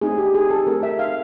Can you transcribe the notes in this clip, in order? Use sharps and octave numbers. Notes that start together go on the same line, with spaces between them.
A3 C4 D#4 G#4
G4
G#4
A4
A3 C4 D#4 A#4
E5
F5